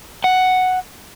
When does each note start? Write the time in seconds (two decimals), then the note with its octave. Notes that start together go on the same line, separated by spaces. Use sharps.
0.24 F#5